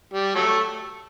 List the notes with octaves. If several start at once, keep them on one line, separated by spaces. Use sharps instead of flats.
G3
F#3 A3